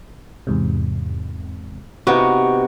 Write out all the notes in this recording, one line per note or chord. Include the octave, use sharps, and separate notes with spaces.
E2 G#2 C3
C3 B3 D#4 F#4